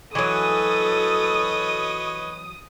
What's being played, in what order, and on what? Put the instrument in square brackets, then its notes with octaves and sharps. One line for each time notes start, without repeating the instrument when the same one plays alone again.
[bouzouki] E3 F#3 [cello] A4 [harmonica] B4 C#5 D#5 [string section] D#6